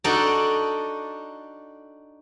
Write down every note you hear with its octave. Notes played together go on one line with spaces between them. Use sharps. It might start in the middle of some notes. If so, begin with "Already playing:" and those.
D4 D#4 F#4 A4 D5